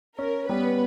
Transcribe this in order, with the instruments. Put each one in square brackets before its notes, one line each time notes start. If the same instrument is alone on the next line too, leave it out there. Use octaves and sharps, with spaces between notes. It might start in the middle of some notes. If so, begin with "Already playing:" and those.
[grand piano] C#4 [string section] A#4
[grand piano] G3 [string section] B3 B4